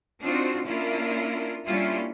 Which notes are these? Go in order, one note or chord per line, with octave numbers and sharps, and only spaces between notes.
C4 D4 D#4 F4 F#4 C5
A#3 C#4 D4 E4 F4 A#4
G3 A#3 C#4 D4 E4 F4